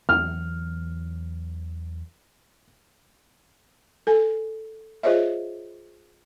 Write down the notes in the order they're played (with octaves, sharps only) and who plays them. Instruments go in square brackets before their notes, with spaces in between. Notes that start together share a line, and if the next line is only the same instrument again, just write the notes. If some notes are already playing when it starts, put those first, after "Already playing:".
[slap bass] E2 E3 F#3 [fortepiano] F6
[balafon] A4 G#5
F4 G#4 C5 C#5 D#5 E5